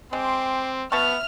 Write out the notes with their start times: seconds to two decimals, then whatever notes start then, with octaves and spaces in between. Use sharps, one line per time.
0.13 G#3 C4 G5 C6 D6
0.92 B2 B3 E5 A5 C#6 F6 F7